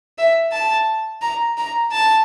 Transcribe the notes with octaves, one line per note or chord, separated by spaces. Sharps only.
E5
A5
A#5
A#5
A5